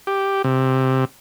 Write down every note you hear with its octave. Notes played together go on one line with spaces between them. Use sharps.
G4
C3